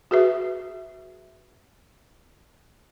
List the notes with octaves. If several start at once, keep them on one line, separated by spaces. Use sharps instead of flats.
F#4 G#4 B4 E5